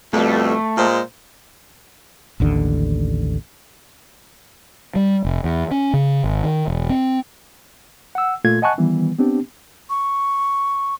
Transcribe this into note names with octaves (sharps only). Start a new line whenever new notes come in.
F2 B2 G3 A3
A#2 G#3 C5
A1 D#2 D3
G3
F1
E2
C#4
C#3
G#1
D#3
E1
C4
F#5 E6
A#2 A3 F4 A4 G#6
D#5 F#5 G#5 A5 C#6 F#6
D#3 E3 G3 B3
B3 C4 D4 G4
C#6